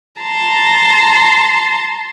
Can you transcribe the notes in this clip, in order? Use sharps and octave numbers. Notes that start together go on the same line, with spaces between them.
A5 A#5 C6